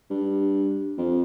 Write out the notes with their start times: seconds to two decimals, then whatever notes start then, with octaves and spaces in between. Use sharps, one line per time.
0.10 G2
0.98 F2